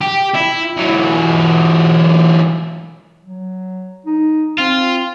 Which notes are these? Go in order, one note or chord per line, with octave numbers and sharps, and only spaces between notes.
G4
E4
E3 F#3
F#3
D#4
C4 F4